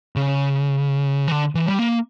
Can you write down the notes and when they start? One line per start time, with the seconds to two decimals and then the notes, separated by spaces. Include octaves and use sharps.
0.16 C#3
1.28 E3
1.32 D3
1.55 E3
1.66 G3
1.79 A#3